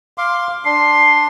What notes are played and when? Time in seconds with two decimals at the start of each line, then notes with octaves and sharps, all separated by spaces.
0.18 F5 C6 D6
0.65 D4 C6 C7